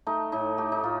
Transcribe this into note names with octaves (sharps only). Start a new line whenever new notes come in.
A3 D#4
A2 D#4
A3 G4
D#4
A2 F4